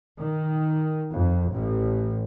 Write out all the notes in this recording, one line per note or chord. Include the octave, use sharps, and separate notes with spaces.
D#3
F2
A1